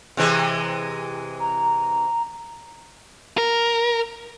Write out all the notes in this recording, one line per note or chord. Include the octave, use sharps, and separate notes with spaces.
C3 E3 G#3
A#5
A#4